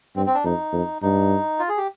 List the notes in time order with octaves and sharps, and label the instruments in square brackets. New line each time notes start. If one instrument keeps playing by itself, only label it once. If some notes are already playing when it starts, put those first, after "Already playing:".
[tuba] G2 [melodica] C4
[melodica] C4
D4
[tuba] F2 [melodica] D#4
[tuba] F2
[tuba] G2 [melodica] D#4
[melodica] F4
G#4
G4